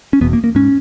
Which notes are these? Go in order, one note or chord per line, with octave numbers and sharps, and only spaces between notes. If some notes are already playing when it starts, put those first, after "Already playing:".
C#4
E1 E2 B2 B3
A#3
A#3
G#2 C#4